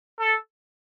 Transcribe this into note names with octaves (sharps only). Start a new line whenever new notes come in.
A4